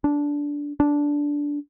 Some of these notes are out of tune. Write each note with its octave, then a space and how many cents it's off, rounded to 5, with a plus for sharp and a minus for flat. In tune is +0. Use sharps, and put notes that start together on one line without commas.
D4 -15
D4 -10